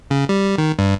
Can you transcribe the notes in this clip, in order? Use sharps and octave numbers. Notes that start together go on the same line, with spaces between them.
C#3
G3
D#3
G2